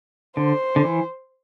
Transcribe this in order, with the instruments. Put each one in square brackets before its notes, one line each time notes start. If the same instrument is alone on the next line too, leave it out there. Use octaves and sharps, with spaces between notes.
[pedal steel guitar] D3 [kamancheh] C5
[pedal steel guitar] D3
E3